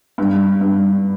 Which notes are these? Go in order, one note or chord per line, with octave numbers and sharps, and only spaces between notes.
G2
G2